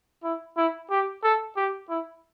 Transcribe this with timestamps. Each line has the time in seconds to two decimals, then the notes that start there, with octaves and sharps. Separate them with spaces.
0.24 E4
0.57 E4
0.90 G4
1.23 A4
1.56 G4
1.89 E4